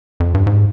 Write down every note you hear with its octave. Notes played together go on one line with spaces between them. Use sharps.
F2
G2
G#2